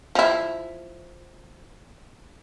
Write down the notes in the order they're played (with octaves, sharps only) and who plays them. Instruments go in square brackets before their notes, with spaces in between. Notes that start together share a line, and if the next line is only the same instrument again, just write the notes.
[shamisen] F3 E4